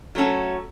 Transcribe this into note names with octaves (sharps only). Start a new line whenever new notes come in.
F#3 A3 C#4 F#4 A4